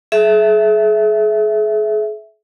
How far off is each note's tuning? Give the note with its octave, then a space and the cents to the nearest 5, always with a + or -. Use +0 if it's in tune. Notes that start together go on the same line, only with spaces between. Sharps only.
G#4 +40 E5 +0